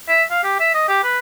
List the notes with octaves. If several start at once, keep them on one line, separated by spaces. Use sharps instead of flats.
E5
F5
G4
E5
D#5
G4
B4